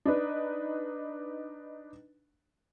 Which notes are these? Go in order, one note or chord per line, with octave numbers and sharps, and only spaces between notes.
D4 D#4 B4